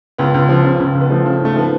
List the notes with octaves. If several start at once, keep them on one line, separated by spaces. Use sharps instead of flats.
C#2 B3
C#2
F3
C#3
C#2
C#2
B3
F3 A3
C#3
G#2 A3
F3 B3